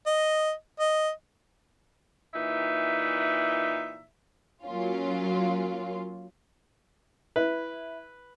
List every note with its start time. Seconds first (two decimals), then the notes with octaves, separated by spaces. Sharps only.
0.07 D#5
0.79 D#5
2.34 A#2 E3 D#4 E5
4.64 F#3 A#3 C#4 F4
7.36 E4 B4